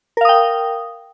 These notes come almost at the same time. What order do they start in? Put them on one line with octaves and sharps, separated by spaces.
A#4 F5 D#6 G5